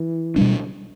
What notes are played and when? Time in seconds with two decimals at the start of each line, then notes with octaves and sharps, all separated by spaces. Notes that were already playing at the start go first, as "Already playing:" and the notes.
Already playing: E3
0.36 B2 G3 D4